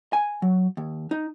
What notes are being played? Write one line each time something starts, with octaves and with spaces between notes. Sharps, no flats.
G#5
F#3
D#2
D#4